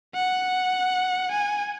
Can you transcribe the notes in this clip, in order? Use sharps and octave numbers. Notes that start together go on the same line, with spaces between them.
F#5
G#5